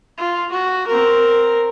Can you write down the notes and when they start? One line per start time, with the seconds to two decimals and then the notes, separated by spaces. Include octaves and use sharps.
0.18 F4
0.51 F#4
0.87 C4 A#4